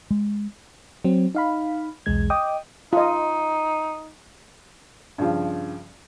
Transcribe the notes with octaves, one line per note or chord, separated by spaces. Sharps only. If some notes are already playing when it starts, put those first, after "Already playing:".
G#3
F#3 C4
D#4 F5 B5
B1 E2 G#3 G#6
D#5 G5 D6 D#6
D#4 F4 D#5
G2 C#3 F3